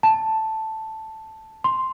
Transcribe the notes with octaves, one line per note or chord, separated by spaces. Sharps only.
A5
C6